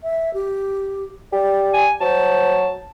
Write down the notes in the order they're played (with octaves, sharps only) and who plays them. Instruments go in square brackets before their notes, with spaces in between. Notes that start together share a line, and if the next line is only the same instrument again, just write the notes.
[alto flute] E5
G4
[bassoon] G4 [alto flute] D5
[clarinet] G#5
[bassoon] F#3 [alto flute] C5 [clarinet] A5